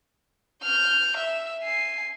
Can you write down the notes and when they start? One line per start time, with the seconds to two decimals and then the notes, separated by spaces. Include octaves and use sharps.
0.63 F6 G6
1.17 E5
1.63 G#5 C7